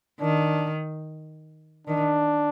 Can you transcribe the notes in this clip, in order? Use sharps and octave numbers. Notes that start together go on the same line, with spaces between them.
D#3 D4
D#3 D4